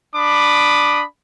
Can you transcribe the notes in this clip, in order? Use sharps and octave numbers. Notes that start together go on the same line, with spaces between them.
D4 B5 D6 D#6